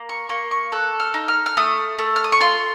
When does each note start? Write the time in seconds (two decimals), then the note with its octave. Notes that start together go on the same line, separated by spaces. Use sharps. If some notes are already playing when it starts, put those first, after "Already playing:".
Already playing: A#3
0.09 C#6
0.29 A#3 C#6
0.51 C#6
0.72 A4 F#6
1.00 F6
1.14 D#4
1.28 F6
1.46 F6
1.57 A3 D#6
1.99 A3
2.16 F6
2.24 D#6
2.32 C#6
2.40 F4 C6